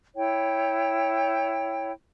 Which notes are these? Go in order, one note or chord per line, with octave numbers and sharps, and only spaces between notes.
E4 C#5 G5